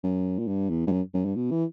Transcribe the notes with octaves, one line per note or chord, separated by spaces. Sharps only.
F#2
A#2
G2
E2
G2
F#2
F#2
G2
B2
E3